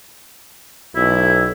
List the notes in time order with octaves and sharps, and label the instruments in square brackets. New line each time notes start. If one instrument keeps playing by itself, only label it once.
[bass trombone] B1 [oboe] E4